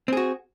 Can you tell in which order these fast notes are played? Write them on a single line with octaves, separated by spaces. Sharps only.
C4 G#4 F#4